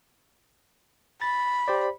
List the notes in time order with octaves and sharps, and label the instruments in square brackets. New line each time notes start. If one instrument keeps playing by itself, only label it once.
[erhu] B5 [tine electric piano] A6
[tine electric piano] G4 C5 D5